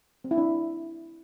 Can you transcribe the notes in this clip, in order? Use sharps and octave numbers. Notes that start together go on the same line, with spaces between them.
C4
E4
D4